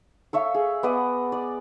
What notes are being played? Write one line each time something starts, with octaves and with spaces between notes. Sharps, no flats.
A4 C#5 E5 F5
G#4
B3 D5 D#5 F#5
D5